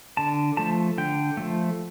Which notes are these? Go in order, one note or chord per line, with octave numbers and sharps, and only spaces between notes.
D3 A5
F3 A3 A5
D3 G5
F3 A3